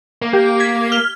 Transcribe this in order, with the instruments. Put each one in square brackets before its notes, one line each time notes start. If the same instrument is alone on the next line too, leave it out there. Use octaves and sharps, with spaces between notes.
[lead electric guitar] A#3
[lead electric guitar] A#3 [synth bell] G4
[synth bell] G#6 B6
F6 G7